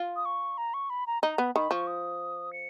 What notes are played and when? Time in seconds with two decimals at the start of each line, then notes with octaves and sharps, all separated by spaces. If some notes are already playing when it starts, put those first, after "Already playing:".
Already playing: F4
0.16 D#6
0.25 C#6
0.58 A#5
0.74 C#6
0.90 B5
1.07 A#5
1.23 D#4 A#5
1.38 B3 B5
1.55 D#3 B5
1.71 F3 C#6
1.87 D#6
2.53 C#7